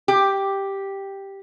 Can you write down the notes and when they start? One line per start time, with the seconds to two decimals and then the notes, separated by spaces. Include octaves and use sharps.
0.08 G4